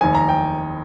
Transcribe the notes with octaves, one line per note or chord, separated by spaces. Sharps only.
F1 D#2 D#3 G#5
A#5
G5